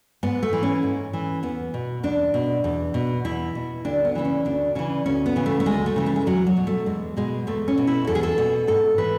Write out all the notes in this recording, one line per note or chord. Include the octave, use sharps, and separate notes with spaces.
G#2 B3
A3
E3
C#4
G#2
E3
E2 B3
B2
E2 D4
B2
E2
B2
E2 E4
B2
D2 D4
B3
C#3 E3 B3
C#4
D2 D4
C#3 E3 C#4
D2 C#4
B3
C#3 E3
A3
A3
D2 G#3
A3
C#3 E3
A3
G#3
E2 F#3
F#3
B2
A3
E2 G#3
B2 G#3
E2 A3
C#4
B2
E4
E2 A4
G#4
A4
B2
G#2 A4
E3 B4